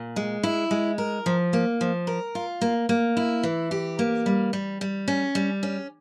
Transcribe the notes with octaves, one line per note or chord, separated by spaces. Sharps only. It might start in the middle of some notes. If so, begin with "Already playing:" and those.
Already playing: A#2
G#3
E4
G#3
A#4
F3
A#3
F3
A#4
F4
A#3
A#3
E4
E3
G4
A#3
G3
G3
G3
C#4
G3
C#4